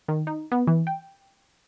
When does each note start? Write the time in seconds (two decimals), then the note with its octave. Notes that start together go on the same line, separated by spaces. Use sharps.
0.09 D#3
0.27 D#4
0.52 B3
0.67 E3
0.87 G5